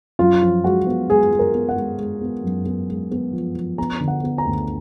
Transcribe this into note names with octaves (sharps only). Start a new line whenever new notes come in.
F#2 F4
F3
G#3 F#4
B3
G#3 G#4
G#3
A#4
B3
F#5
G#3
G#3
B3
F#2
B3
G#3
B3
F3
F3
B3 A#5
D3
F#5
B3
A#5
D2